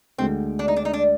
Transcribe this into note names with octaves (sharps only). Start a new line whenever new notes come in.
D2 D3 G#3 C4
D4
D#4
D4
D#4
D4